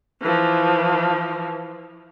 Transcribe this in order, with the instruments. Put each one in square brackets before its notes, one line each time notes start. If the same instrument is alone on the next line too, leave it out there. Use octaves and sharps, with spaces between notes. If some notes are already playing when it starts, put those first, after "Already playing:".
[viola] E3 F3